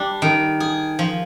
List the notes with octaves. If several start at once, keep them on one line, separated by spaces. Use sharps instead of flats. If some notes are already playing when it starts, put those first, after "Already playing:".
Already playing: G3 D4
D#3
G#4
F3